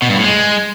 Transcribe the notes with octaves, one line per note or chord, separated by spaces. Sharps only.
B2
G2
A2
G#3